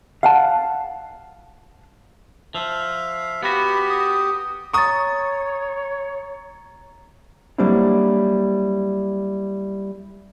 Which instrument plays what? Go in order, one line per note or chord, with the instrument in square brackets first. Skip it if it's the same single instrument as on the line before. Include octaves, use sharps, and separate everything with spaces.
[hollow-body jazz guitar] F5 F#5 A5
[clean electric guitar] F3 [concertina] E5 F5
[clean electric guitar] B3 F#4 [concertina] G4 [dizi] B5
[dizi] D#6
[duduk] C#5 [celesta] A#5 A6 [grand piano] C#6 D#6
[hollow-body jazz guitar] F#3 G3 A#3 C4 D4 E4